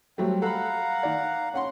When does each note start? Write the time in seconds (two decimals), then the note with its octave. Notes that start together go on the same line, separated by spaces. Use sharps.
0.18 F#3 G3 A3 C4
0.42 A4 F5 F#5 A#5 B5
1.03 D#3 D5
1.54 C#4 F#5 C6